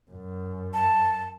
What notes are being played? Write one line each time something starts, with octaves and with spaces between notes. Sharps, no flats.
F#2
A5